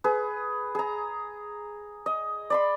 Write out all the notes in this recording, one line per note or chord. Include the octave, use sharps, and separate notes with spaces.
G#4 B4
G#4 A#5
D#5
D5 B5 C6